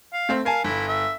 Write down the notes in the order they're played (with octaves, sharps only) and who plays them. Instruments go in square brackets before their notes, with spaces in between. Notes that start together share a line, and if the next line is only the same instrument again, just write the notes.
[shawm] F5
[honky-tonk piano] A3 C4
[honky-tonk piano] A#4 G#5 A5 [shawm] F5
[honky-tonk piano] G1 [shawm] E4
[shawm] E5